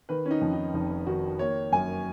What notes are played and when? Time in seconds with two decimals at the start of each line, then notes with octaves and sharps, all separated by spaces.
0.09 D#3 B4
0.26 C#4
0.31 D#4
0.41 F2
0.53 D#4
0.74 F1 D#4
1.07 D#3 F#4
1.39 A#3 C#5
1.72 F#2 G#5